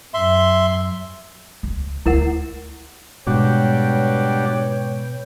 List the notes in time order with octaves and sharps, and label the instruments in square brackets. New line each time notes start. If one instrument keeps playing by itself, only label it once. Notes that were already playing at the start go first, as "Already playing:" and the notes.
[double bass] F#2 [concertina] E5 C6
[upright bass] C#2
[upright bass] D2 [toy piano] E4 A#4 F#5
[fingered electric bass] G#2 [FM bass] B2 [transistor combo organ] G3 D4 F#4 [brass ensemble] B4 C#5 G5